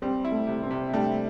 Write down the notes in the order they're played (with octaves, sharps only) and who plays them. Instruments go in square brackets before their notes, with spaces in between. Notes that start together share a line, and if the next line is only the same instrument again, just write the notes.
[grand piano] G3 [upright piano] C4
[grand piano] E4
[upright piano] A3
[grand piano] C3
[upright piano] C4
[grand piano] C3
[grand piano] G3 [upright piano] A3 D4